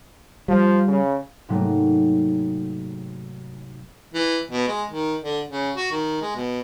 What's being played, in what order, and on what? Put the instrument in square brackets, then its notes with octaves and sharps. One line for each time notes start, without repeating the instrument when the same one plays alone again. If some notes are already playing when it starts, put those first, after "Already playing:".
[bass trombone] F3 [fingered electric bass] G3
[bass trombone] C#3
[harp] G#2 C3 F#3 A3 A#3 D#4
[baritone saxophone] E3
B2
G#3
D#3
D3
C#3
F#4
D#3
G#3
B2